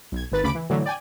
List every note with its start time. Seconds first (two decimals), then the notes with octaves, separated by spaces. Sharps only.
0.12 B1 G#6
0.32 G#1 D#3 B4 A6
0.43 D2 C#3 B5 D6 D7
0.55 E3
0.70 A2 D3 E3 F#3
0.86 D5 G5 G#5